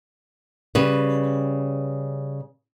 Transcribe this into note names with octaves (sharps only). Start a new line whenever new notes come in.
C#3 G3 B4